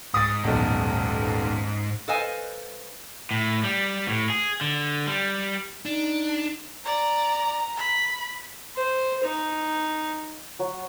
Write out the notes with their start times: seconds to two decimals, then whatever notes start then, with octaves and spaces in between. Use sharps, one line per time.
0.14 G#2 D#6 A6
0.44 D#1 B1
2.08 A4 B4 C5 D#5 F5 G#5
3.31 A2
3.64 G3
4.08 A2
4.30 G#4
4.61 D3
5.07 G3
5.86 D4 D#4
6.85 D5 A#5
7.77 B5
8.76 C5
9.24 D#4
10.59 F#3